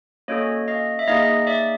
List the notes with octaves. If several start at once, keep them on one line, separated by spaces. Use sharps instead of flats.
A#3 C#4 F#4 A4 C#5 D#5
D#5 F5
E5
A#3 D#4 G#4 D#5 F5
D5 E5